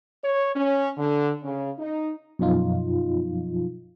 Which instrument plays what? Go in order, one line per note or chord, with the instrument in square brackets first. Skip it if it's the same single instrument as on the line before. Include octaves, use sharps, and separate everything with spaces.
[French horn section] C#5
C#4
D3
C#3
D#4
[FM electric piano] F#2 B2 F3 D#4 F4